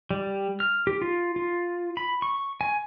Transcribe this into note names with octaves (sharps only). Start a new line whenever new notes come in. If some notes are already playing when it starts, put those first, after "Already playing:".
G3
F6
G4
F4
F4
B5
C#6
G#5